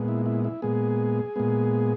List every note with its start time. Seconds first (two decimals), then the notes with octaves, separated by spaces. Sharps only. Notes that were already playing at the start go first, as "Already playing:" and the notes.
Already playing: A#2 G#3 B3
0.08 E4
0.26 E4
0.44 E4
0.62 A#2 G#3 B3 G#4
1.36 A#2 G#3 B3